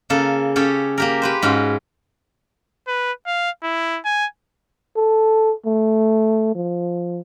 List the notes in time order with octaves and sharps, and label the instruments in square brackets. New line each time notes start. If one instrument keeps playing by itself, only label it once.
[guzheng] C#3 A#3 A4
C#4 G4 A4 C#5
A#3 G4 A#4
G4 B4 C5
G#2 C#4 F#4 F5
[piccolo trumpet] B4
F5
E4
G#5
[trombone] A4
A3
F3